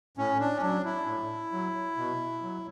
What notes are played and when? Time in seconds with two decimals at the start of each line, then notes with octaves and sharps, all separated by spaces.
0.17 A2 C#4
0.40 D4
0.57 C#4
0.62 F#3 D4
0.85 E4
1.07 A2
1.52 F#3
1.97 B2
2.42 F#3